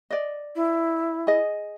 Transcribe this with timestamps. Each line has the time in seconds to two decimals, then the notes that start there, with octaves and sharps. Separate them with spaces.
0.11 D5 D#5
0.56 E4
1.27 G#4 D#5